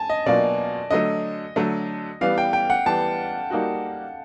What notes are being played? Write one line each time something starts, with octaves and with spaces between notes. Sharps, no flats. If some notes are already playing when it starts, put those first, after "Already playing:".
Already playing: G#5 A5
D#5
B2 F#3 A#3 D4 F4 D5
D3 F#3 A3 D#5
D3 F#3 A3
E3 G3 B3 F5
G5
G5
F#5
E3 G3 B3 A5
G3 A#3 D#4 F#4